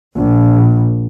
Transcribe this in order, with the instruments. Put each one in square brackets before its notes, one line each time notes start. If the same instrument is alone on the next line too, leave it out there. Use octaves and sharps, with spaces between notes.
[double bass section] A#1